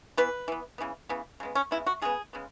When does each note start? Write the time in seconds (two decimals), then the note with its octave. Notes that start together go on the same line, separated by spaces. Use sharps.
0.17 E3 B3 B4
0.48 E3 B3
0.78 C#3 E3 B3
1.09 C#3 E3 B3
1.40 C#3 G#3 B3
1.55 C#4
1.71 C#3 G#3 B3 E4
1.86 F#4
2.02 C#3 G#3 B3 G#4
2.33 C#3 G#3 B3